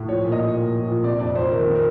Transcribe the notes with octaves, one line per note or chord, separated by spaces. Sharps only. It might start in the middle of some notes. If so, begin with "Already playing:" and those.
Already playing: A2
F3 C#5
A#2
D#5
F3
A#2
F3
A#2
C3 D5
F2 D5
F2 C5
D#3 A#4
C3
A#4